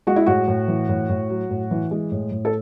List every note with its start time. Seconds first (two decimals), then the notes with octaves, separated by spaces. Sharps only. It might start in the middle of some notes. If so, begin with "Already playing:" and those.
0.07 G#3 F#4
0.16 E4
0.26 A2 F#4
0.48 A2
0.68 E3
0.89 A2
1.09 A2
1.30 F#3
1.50 A2
1.71 E3
1.91 G#3
2.11 A2
2.32 A2
2.45 A4